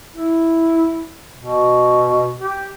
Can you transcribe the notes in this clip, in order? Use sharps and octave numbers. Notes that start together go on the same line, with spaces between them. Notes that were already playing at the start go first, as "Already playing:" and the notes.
E4
B2
G4